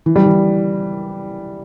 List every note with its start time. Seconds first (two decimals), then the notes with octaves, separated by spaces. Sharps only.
0.06 E3
0.16 G3
0.26 E3